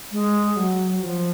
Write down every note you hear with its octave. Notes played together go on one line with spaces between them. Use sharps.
G#3
F#3
F3